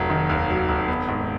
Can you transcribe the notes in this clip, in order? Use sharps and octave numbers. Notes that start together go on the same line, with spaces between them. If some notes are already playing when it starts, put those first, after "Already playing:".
Already playing: F1 F#3
D#3
D#2
F#3
F1
B3
G#2